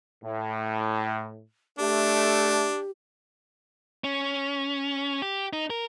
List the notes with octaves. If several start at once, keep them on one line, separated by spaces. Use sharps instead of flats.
A2
A3 D4 G4
C#4
G4
D#4
A#4